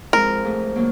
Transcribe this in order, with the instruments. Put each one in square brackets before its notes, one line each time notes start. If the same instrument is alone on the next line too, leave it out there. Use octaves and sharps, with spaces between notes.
[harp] F3 G#3 C4 F4 [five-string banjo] A#4
[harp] G#2 F3 A3
D3 F#3 A#3